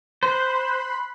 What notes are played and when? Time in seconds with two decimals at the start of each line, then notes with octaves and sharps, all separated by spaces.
0.23 C5 B5 C6 F#6